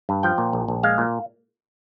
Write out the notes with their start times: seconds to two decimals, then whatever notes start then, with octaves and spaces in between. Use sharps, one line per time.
0.09 G2
0.23 F3 G5
0.38 A#2
0.53 A#1
0.68 A#1
0.83 G#3 F5
0.98 A#2